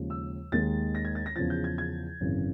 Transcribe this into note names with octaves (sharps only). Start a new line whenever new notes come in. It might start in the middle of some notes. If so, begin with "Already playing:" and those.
Already playing: D#2 C#3 F3 G#3
E6
D#2 D#3 G#3 A6
A#6
G#6
A6
A#6
E2 C#3 F3 A6
G6
G#6
G#6
G#1 F#2 C#3 E3